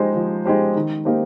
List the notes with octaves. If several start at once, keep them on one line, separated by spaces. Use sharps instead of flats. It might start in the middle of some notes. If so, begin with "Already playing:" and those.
Already playing: F3 G#3 D#4 G4 C5
F3
G#3 D#4 G4 C5
D#3
A#3 D#4 G4 C5